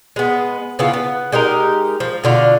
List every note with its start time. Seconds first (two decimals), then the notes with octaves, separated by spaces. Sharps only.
0.16 G#3 B3
0.79 C#3 B3 E4 F4
0.93 B3
1.32 G#3 D#4 G4 A#4
2.00 F3
2.24 B2 D3 F4